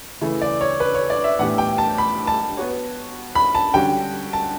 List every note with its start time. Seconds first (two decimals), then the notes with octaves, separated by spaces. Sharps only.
0.21 C#3 E3 A3 E4
0.42 D5
0.61 C#5
0.80 B4
0.95 C#5
1.10 D5
1.24 E5
1.39 A2 E3 B3 D4 G4 F#5
1.58 G5
1.78 A5
1.98 B5
2.27 A5
2.57 B3 F#4 C#5
3.35 B5
3.55 A5
3.74 D3 G3 C#4 F#4 G5
4.33 A5